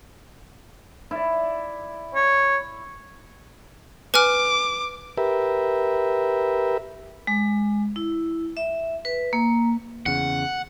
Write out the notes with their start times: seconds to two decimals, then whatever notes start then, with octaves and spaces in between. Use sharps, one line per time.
1.11 E4 D5
2.15 C#5
4.14 B4 G#5 D6 F6
5.18 G4 A#4 B4 E5
7.27 G#3
7.96 E4
8.57 E5
9.05 B4
9.33 A#3
10.06 E2 C#3 F#5